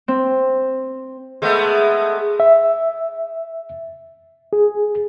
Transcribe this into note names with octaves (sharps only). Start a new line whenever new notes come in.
C4
G#3 A3 B3
E5
G#4